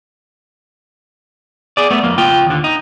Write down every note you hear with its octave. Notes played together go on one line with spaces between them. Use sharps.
G#4 D5
A3 B3
F2 A#3
C#2 F4 G5
D#2 D3
D#4